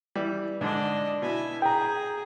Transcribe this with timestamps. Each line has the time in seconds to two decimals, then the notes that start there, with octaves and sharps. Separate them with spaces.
0.15 E3 G3
0.61 G#2 D3 D4 D#5
1.22 B2 E4 G#5
1.62 G#4 G5 A#5